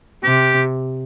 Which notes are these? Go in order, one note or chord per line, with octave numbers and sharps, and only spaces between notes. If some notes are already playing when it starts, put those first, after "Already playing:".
C3 G4